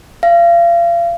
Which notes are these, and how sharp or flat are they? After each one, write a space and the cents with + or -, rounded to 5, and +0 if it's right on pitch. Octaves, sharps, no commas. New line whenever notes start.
F5 -35